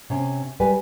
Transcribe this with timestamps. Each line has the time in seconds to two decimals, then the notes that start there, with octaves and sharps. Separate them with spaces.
0.10 C3 C#4
0.60 G3 B4 G#5